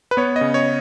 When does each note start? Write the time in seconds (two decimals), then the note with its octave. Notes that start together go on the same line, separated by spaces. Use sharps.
0.11 B4
0.17 B3 C#5
0.36 D#5
0.41 C#3
0.54 C#5